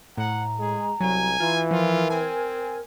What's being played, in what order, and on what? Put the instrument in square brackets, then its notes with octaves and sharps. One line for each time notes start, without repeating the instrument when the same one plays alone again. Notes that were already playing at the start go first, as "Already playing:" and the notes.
[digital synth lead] A2 [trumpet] F#5 [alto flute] A#5
[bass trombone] G#3 [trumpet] G#4
[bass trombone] C2 [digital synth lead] F#3 [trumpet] G#5
[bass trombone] E3 [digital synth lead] F4
[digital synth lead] F3 [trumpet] F4 [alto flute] A#4
[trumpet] C4 [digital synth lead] G#5